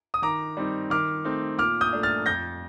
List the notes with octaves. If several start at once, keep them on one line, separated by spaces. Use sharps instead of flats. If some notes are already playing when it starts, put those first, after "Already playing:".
D#6
D#3 A#5 D6
G3 C4 D#4
D#3 D6 F6
A3 C4 D#4
A#2 D6 F6
D#6 G6
A3 D4
F6 A6
F2 G6 A#6